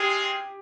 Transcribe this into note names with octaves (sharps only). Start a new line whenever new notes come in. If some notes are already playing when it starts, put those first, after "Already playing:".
Already playing: G#3 C4 F4 G4 G#4